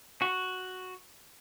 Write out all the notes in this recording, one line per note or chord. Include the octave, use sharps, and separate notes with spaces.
F#4